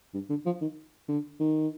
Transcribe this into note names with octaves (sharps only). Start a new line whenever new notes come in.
G2
D3
F3
D#3
D3
D#3